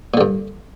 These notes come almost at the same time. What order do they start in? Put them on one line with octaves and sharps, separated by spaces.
A#2 D3 G2